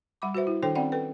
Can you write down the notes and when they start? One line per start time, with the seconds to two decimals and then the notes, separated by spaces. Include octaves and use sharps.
0.22 G3 F#5 B5 D6
0.35 F#4 B4 C5 E5
0.47 E4
0.63 D#3 D4 A4 C5 G5
0.75 C4 C#4 D5 F#5 G5
0.92 A4 B4 G5